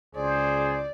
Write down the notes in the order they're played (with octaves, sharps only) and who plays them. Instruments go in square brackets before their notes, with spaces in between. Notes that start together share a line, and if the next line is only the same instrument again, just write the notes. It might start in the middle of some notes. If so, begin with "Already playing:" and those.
[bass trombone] C#2 [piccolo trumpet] G#4 [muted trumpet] C5 [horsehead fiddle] D5